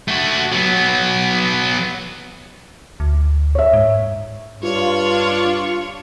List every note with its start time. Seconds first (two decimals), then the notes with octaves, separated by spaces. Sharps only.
0.08 A3 F#4
0.52 F#3 B3
3.00 D2
3.55 C#5 E5
3.73 G#2
4.63 G2 D4 F4 C#5